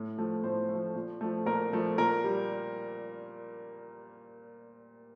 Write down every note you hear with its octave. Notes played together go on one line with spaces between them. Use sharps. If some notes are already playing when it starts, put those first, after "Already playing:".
Already playing: A2
F3 A3
A2 C5
A3
F3
A#2
F3 A3
A#2 A#4
F3 A3
A#2 A#4
G3